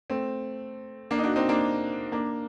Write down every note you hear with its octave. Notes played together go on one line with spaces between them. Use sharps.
A3 C4
A#3 D4
D#4
D4 F#4
C4 D#4
A#3 D4
A#3 D4